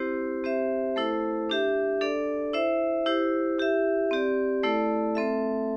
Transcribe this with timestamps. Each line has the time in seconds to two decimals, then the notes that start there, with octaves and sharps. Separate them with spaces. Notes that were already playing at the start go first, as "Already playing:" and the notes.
Already playing: C4 E4 G4 C5
0.44 C4 G4 C5 E5
0.96 A3 E4 A4 C5
1.50 D4 G4 E5
2.01 D4 A4 D5
2.53 E4 C5 E5
3.06 E4 G4 C5
3.59 E4 G4 E5
4.11 C4 G4 D5
4.63 A3 E4 A4 D5
5.15 A3 C4 A4 E5